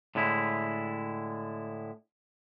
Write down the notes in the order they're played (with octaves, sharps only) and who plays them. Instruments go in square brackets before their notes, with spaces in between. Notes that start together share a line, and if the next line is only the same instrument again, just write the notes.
[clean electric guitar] A2 D3 G#3 E4